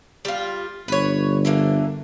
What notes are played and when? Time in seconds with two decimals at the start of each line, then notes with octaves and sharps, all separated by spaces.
0.25 G3 F4
0.88 G1 B4 C#5
1.45 D3 E3 A#3